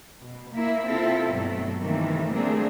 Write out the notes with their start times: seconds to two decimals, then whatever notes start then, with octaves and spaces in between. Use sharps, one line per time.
0.20 B2
0.52 A#3 E4
0.88 C3 C4 E4 F4 A4
1.31 G2 B2 F#3 A3
1.79 C3 D#3 E3 A3 A#3
2.33 G3 A3 A#3 C4 D4 G#4